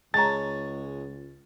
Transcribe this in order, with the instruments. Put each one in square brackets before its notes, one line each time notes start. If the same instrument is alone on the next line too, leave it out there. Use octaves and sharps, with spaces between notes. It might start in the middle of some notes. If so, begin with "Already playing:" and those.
[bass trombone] C#2 [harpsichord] G#3 C#5 [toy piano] A5 A#5 [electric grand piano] A6